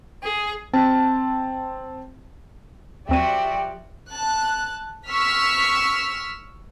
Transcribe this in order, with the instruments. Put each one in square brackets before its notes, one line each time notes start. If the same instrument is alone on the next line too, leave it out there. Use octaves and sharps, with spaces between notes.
[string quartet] G#4
[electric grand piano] C4 A5
[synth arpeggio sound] D#2 C4 D#7 [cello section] F3 F#4 D5 [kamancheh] G4 [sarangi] E5
[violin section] A5 F#6
C#6 E6 F6 B6